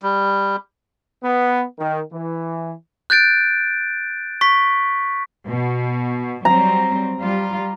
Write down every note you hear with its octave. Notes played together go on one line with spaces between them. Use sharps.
G3
B3
D#3
E3
F#6 G6 A6 D7
C#6 B6
B2
F#3 G3 C4 A#5
G3 F4